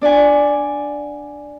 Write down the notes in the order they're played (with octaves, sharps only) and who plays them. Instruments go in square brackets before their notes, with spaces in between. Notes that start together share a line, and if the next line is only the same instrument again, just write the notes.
[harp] D4 D5 F#5 G#5